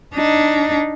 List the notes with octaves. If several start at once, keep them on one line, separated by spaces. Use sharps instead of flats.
D4 D#4